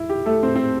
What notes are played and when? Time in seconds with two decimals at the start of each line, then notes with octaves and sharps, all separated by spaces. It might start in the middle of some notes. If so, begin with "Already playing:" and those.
Already playing: E1 E4
0.10 G4
0.26 A3 A4
0.43 C4 C5
0.55 C4 C5